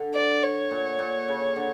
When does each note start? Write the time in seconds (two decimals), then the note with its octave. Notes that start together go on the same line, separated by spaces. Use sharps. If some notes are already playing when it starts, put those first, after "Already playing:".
Already playing: D3
0.14 D5
0.43 C#5
0.71 A#2
0.99 A#2
1.28 C#3
1.56 D3